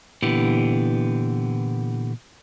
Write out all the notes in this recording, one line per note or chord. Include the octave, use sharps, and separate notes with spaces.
A#2 D3 E3 B3 E4 G4